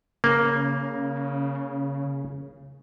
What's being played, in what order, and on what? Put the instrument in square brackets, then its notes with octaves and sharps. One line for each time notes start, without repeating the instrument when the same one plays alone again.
[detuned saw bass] C#3 [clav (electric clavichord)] A#3